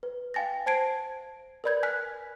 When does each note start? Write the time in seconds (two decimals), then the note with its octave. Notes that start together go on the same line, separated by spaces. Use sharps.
0.03 B4
0.34 F5 G5 G#5 A6 A#6
0.66 C5 A5 G#6 C7 D7
1.64 A#4 B4 D5 B5 G6 G#6
1.83 G#5 F6 F#6 B6